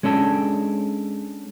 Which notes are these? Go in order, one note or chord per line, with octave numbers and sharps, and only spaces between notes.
G#3 C#4 D4 A4